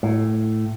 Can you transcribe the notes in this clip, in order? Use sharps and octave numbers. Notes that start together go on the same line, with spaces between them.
A2